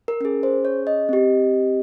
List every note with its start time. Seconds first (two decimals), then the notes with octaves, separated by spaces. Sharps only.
0.08 A#4
0.20 C#4 G#4 A#4
0.43 C5
0.65 C#5
0.87 D#5
1.09 C4 G4